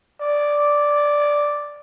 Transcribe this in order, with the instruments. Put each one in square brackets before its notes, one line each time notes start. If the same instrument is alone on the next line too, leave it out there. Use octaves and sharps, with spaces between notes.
[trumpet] D5